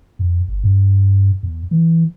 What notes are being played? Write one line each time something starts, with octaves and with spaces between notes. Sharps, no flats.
F2
G1
G2
E2
E3